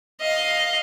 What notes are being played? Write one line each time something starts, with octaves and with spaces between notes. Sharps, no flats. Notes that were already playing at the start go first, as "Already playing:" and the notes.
D#5 F5